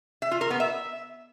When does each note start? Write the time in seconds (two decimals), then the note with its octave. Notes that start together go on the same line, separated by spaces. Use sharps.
0.22 E5
0.31 F4
0.41 A#4
0.50 B3
0.60 E5